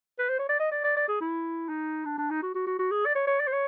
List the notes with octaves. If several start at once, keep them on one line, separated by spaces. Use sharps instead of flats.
B4
C5
C#5
D5
D#5
D5
D5
D5
G#4
E4
D#4
D4
D4
D#4
F#4
F#4
F#4
F#4
G#4
D5
C#5
C#5
D5
C5
C#5